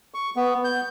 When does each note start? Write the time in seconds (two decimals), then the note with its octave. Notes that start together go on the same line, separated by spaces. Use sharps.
0.14 C#6
0.36 B3
0.64 G6